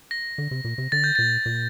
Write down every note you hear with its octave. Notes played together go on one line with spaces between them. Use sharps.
A#6
D3
C3
A#2
C3
D3 A6
G6
A#2 A6
A#2